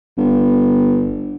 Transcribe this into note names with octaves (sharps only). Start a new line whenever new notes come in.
G1